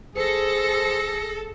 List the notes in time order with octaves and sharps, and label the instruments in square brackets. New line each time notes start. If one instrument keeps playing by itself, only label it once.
[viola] G#4 [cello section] A4 [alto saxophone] C5 [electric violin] A#6 C#7